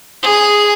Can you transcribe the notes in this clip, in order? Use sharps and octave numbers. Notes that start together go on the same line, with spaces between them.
G#4